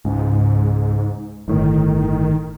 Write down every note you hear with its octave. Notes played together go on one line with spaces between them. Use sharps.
C#2 G#2
G1 A2 D#3